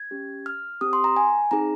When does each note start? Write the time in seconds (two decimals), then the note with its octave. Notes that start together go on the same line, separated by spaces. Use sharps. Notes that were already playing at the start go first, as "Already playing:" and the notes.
Already playing: G#6
0.11 C#4 G4
0.46 F6
0.81 C4 G4 D#6
0.93 C6
1.04 A#5
1.16 G#5
1.51 C4 D#4 G#4 A#5